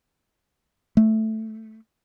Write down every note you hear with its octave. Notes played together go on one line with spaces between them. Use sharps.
A3